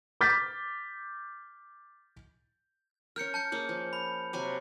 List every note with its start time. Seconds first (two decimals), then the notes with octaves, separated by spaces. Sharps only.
0.21 D6 F6 G6 A6 B6
3.16 C#4 A#4 F6 G6 C#7
3.34 A5 G6 C#7
3.52 A#3 C#4 G#4
3.69 F3
3.93 B5
4.33 C3 F#3 G#5